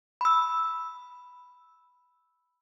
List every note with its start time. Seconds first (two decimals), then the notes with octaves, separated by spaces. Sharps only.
0.21 B5 E6